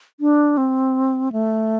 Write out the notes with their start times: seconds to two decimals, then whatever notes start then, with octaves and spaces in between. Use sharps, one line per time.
0.20 D4
0.57 C4
1.32 A3